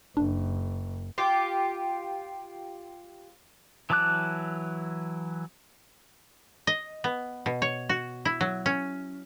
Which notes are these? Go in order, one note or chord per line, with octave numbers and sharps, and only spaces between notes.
F#1 D4
F4 G4
E3 F#3 A5 D6 F#6
D#5
B3
B2
C#5
F#4
E4
F#3
C#4